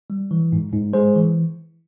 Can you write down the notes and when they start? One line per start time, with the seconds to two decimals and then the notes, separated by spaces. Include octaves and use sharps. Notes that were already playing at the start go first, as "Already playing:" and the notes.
0.10 G3
0.31 E3
0.52 G#2
0.72 G#2
0.93 G#3 G#4 C5
1.15 E3